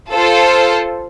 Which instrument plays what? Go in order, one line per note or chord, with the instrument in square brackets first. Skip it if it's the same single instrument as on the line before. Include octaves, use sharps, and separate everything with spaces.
[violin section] F4 A4 C5